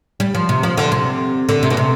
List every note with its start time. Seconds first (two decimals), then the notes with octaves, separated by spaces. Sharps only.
0.20 G3
0.35 F3
0.49 C3
0.63 F3
0.77 D3
0.92 C3
1.49 D3
1.63 C3
1.70 B2
1.77 C3